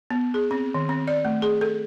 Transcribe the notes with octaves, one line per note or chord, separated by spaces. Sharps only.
B3
G#4
C4
D#3
C4
D5
A3
G#4
A4